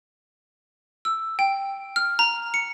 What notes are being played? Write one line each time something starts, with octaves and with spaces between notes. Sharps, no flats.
E6
G5
F6
A#5
C#7